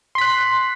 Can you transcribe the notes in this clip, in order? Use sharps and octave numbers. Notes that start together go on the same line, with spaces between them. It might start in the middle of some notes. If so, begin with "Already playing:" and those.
C6 F#6 B6